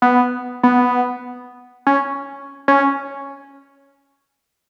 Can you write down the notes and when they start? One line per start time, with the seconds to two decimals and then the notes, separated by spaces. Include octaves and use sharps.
0.02 B3
0.63 B3
1.87 C#4
2.68 C#4